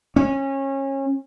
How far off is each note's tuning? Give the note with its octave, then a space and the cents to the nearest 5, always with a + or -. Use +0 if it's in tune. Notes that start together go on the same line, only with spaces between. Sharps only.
C#4 -25